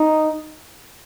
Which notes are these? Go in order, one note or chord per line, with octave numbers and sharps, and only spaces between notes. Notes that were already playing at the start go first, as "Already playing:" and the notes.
Already playing: D#4